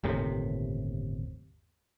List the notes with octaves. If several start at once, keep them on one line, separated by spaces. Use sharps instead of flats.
G1 D#2 A2 C3